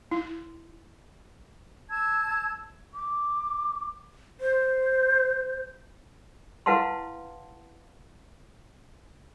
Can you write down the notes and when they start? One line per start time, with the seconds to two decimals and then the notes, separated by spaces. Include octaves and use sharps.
0.11 E4
1.89 A5 E6 G#6
2.94 D6
4.41 C5
6.66 E4 B4 F5 F#5 A5 C6